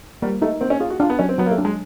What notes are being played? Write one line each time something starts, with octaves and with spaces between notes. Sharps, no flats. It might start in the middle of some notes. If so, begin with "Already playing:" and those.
G3 A#3
A3 D#4
A#3 C4
C#4
F4 G#4
F#4
D4 F4
B3
F#3 C#4
C4
F#3 B3
A#3
A3
D4
G#3